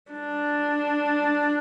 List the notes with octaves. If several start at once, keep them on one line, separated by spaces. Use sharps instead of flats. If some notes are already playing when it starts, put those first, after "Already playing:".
D4